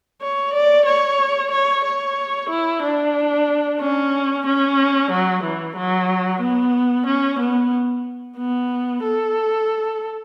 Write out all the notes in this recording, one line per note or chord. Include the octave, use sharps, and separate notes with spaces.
C#5
D5
C#5
C#5
C#5
E4
D4
C#4
C#4
F#3
E3
F#3
B3
C#4
B3
B3
A4